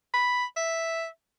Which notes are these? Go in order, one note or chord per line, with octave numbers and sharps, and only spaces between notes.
B5
E5